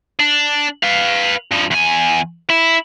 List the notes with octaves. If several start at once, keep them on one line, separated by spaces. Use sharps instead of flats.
D4
B4 F5
G2 F3
E2 G#5
E4